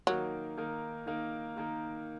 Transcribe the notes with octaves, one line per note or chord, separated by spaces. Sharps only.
D#3 F#3 A#3 D#4 A#4
D#3 A#3 D#4 A#4
D#3 A#3 D#4 A#4
D#3 A#3 D#4 A#4